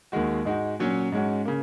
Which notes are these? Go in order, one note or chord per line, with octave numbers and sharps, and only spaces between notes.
D#2 D#3 G#3 F#4
G#2 G#3 D#4 F#4
A#2 F#3 C#4
G#2 G#3 C#4 F#4
C#3 A#3